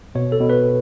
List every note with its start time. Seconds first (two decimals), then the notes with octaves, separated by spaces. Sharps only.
0.15 B2 C#5
0.32 A4
0.40 B2
0.49 B4